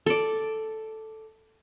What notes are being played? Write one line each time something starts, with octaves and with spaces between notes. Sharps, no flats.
A4 D5